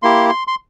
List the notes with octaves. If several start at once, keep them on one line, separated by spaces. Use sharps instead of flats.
A#3 E4 G4 C6
C6
C6